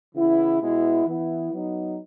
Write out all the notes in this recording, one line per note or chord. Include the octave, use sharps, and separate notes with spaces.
C#3 E3 B3 E4
B2 G#3 B3 E4
E3 B3 E4
F#3 B3 D#4